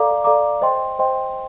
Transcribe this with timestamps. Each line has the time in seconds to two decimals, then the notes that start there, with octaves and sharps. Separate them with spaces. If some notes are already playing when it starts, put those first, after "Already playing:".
Already playing: A4 D5 F5 A#5 D6
0.24 A4 D5 F5 A#5 D6
0.61 C5 D#5 G5 C6
0.99 C5 D#5 G5 C6